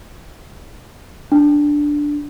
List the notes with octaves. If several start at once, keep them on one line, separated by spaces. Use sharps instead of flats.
D4